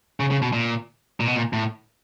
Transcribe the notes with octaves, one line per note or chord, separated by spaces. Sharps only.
C#3
C#3
B2
A#2
A#2
B2
A#2
A2